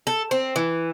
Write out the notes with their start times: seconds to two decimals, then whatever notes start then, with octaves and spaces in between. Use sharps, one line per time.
0.07 A4
0.31 C4
0.56 E3